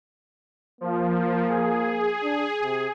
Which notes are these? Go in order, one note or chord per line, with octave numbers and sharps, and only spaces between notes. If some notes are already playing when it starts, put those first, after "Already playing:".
F3 A#3
G#4
D4
C3